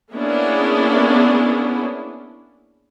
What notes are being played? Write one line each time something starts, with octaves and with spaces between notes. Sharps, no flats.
A#3 B3 C#4 D4 E4 G#4